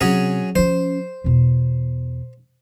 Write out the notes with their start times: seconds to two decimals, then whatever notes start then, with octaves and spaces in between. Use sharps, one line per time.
0.01 C3 F#3 C#4 G#4
0.56 F3 C#4 C5
1.24 E2 B2